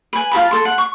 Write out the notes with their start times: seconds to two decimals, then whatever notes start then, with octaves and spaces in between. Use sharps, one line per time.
0.13 B4 G#5
0.32 F4 A4 A5 B5
0.51 A4 C6
0.65 F#5
0.78 C#6